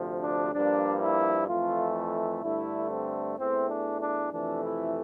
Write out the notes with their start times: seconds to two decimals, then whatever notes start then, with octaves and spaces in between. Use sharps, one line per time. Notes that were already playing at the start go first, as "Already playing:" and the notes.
Already playing: D2 C3 F3
0.22 D4
0.53 G2 F3 A#3 D4
1.01 E4
1.48 F2 E3 A3 F4
2.43 G2 D3 A3 E4
2.90 C4
3.38 E2 E3 A3 C4
3.69 D4
4.01 D4
4.32 F2 C3 E3 A3 D4
4.64 E4